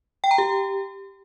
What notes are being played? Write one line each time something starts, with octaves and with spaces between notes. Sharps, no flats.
G5
A#5
G4